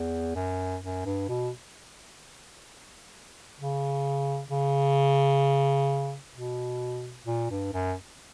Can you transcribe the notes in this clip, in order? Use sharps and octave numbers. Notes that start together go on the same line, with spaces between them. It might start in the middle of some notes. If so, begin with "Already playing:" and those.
Already playing: E2
F#2
F#2
G2
B2
C#3
C#3
B2
A#2
G2
F#2